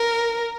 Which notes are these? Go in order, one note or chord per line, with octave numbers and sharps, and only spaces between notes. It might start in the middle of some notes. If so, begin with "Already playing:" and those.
Already playing: A#4